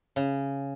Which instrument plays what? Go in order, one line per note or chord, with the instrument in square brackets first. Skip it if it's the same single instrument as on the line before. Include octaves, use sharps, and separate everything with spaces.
[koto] C#3